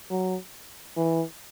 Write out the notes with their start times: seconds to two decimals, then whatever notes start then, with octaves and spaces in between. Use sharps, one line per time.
0.10 F#3
0.97 E3